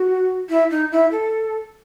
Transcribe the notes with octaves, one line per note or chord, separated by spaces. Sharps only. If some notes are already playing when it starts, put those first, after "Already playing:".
Already playing: F#4
E4
D#4
E4
A4